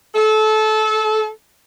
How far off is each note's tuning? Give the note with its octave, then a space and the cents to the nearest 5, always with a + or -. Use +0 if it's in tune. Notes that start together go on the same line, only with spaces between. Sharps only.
A4 -25